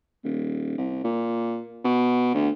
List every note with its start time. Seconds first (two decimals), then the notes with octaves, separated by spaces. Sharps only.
0.24 D#1
0.78 C2
1.04 A#2
1.84 B2
2.34 D2